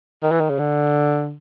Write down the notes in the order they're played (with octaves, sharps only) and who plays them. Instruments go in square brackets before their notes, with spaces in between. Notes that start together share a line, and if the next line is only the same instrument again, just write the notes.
[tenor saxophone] D#3
E3
D#3
C#3
D3